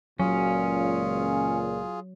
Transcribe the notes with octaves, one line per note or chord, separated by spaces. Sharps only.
C#2 A#2 F#3 C#4 F4 G#4